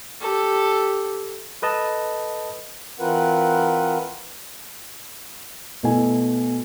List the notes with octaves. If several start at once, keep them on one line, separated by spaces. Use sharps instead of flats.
G4 A4
A4 B4 D#5 A5
E3 C4 F4 A#4 B4 F#5
B2 A3 E4 G#5